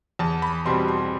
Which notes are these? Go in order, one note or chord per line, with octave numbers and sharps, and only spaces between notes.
E2 A5
B5
B2 G3 C4 C6
C6